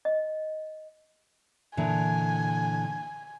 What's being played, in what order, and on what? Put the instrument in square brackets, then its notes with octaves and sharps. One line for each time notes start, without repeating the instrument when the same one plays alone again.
[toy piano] D#5
[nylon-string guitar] A#2 D3 E3 [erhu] G#5